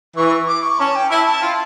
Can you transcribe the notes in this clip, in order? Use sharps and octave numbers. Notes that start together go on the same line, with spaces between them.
E3 C#6
D6
C#6
C#4 A5
G5
E4 A5
A5
F4